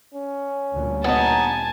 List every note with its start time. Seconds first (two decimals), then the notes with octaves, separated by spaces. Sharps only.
0.14 C#4
0.73 D2 A#2 G3
1.04 B3 D#4 G#5 A5